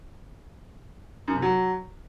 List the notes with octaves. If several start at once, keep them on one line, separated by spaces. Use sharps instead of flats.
F#2
C3
F#3